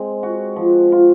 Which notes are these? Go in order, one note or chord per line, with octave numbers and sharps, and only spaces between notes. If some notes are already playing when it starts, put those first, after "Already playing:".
Already playing: G#3 C4
F#4
F3
F4